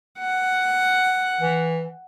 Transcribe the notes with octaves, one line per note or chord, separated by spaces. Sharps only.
F#5
E3